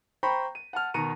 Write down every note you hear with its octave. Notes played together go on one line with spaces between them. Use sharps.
C5 G5 A#5 B5 C#6
D#7
F#5 A5 F6
B2 D#3 A#5 C#7 D#7